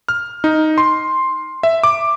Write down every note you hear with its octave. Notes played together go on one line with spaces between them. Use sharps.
F6
D#4
C6
E5
D6